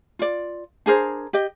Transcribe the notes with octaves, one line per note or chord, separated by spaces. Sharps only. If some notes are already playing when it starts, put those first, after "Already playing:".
F4 D5
D4 G#4 A#4 C5
G4 D#5